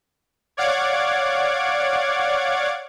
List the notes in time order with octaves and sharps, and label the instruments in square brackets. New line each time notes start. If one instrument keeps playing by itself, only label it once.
[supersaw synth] C#5 D5 F5 F#5 D6 G#6